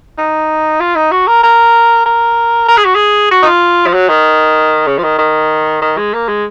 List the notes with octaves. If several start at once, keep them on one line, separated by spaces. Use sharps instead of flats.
D#4
F4
D#4
F#4
A#4
A#4
A#4
A#4
G#4
F#4
G#4
F#4
D#4
F4
F3
F#3
D#3
C#3
F3
D#3
D#3
D#3
G#3
A#3
G#3